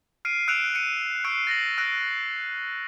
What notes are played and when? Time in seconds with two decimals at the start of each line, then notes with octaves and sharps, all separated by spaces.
0.25 F6 C7 D7 D#7
0.48 E6 F#6 C#7 D7 E7 F7
0.75 C#7 D#7
1.24 C#6 E6 F#6 C7 D7
1.47 A6 A#6 D7 F#7
1.78 E6 F#6 A#6 D7